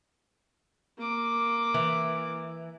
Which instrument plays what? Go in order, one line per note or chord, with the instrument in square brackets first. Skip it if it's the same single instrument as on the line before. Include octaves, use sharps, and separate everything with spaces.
[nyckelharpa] A#3 D6
[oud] E3